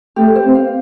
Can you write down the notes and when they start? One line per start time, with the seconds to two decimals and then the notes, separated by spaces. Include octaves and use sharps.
0.16 A3 G4
0.35 C5
0.46 C4
0.55 F5